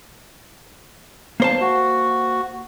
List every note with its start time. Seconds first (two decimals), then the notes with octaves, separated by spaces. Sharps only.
1.40 A#3 C5 A5
1.61 F#4